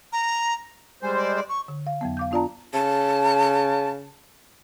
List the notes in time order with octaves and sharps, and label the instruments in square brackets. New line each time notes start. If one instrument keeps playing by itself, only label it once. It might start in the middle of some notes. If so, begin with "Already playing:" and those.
[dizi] A#5
[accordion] G3 G#3 C5 [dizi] G#5
[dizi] D5
D5
C#6
[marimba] D3
F5
F2 F#3 B3
F5 D6 G6
B3 D4 F4 D5 A5 A#5
[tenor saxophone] C#3 [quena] A5